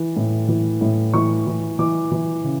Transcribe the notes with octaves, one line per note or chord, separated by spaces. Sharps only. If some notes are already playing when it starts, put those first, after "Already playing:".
Already playing: E3
A2
E3
A2
E3 C#6
E3
E3 D6
E3
C#3